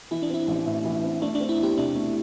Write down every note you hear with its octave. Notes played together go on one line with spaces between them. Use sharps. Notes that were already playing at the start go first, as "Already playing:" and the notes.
E3 E4
D4
C4 E4
A1
A2
E3
C4
A3 D4
D4
C4
E4
E2 G4
C3 D4
A3